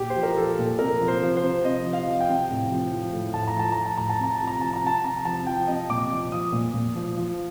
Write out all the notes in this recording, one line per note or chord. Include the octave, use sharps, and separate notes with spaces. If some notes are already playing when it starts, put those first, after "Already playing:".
Already playing: A#2 G4
C5
F3
A#4
F3 A4
A#2
C3 A#4
F3
C5
F3
C5
C3
C3 D#5
F3
F5
F3
G5
C3
A2
F3
F3
A2
A2 A5
A#5
F3 A5
F3 A#5
A5
A2 A#5
A5
C3 A#5
A5
F3
A#5
F3 A5
A#5
C3 A5
C3 A#5
F3 A5
F3 G5
C3 D#5
A#2 D6
F3
F3 D#6
A#2
A#2
F3
F3